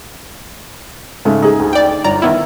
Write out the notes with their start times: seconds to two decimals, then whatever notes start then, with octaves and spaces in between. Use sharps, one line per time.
1.25 G#2 C#3 A3
1.42 D#4 G#4
1.59 D2
1.73 D5 G5
2.04 G1 D5 A#5
2.22 D#3 B3 E4 E5